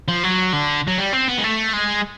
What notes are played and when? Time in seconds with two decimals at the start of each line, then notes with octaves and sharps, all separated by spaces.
0.08 F3
0.23 F#3
0.53 D3
0.88 F#3
0.98 G3
1.13 C4
1.28 B3
1.38 G#3
1.44 A3
1.73 G#3